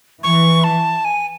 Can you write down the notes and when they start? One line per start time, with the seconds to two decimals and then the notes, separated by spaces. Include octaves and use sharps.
0.23 E3 C#6
0.64 A5
1.05 G#5